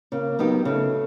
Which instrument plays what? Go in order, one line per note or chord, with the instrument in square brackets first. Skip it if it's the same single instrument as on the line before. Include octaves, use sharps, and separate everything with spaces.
[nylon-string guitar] C#3 [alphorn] A#3
[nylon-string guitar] F#3 B3 D#4 G4
[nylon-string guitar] C#3 [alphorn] A3